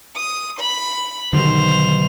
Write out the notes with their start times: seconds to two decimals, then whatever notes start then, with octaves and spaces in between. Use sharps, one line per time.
0.15 D#6
0.60 B5
1.33 B1 D3 D#3 G3 C5 F7